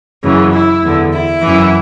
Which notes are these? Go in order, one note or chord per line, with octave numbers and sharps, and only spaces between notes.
F#2 C#3 E3
E4
E2 D3
E4
F#2 E3